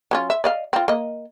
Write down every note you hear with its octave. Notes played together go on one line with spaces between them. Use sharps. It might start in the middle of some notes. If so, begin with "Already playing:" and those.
F#3 C#4 F4
E5
D5 D#5 F5
C4 F4
A#3 D#5